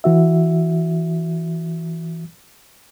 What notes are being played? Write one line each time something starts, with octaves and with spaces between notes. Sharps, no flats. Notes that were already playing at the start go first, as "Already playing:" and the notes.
E3 F#4 E5